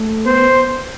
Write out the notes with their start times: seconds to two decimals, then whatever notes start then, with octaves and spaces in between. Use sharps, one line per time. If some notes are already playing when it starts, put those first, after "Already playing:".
Already playing: A3
0.26 B3 C5